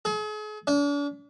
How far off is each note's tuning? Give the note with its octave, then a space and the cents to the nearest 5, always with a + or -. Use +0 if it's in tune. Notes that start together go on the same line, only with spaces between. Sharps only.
G#4 +40
D4 -40